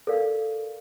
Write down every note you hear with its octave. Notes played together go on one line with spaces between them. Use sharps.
A4 A#4 D5 F5